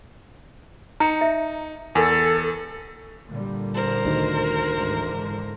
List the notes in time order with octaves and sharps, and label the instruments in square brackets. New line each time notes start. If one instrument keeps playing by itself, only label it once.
[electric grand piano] D#4 C#7 [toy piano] A#5
[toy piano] E5
[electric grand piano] E2 [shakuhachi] A4 [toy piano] A#4 G#5
[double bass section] A#2 D3 G3
[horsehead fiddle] A#4 C5
[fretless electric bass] D2 D#3
[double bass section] G#2 D3 E3